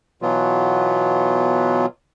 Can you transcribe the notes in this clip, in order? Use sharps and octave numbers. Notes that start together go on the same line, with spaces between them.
B2 E3 F#3 B3 F4